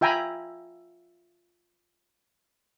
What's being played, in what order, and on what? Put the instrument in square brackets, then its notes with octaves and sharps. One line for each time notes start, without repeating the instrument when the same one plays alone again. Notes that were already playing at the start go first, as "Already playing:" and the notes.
[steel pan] F4 E5 G5 G#5 A#5 B5